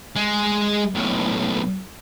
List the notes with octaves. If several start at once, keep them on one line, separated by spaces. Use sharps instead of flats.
G#3
B1 A2